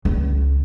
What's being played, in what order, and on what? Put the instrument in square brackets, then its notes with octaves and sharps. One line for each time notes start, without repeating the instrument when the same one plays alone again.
[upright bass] C#2